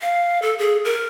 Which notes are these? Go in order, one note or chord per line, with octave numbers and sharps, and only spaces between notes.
F5
A4
G#4
A#4